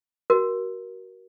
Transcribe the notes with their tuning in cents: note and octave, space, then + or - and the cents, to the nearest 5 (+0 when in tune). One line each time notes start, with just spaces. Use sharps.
F#4 +25 A#4 +20